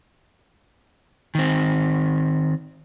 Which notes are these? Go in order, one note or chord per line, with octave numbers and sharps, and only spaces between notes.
D#3 C4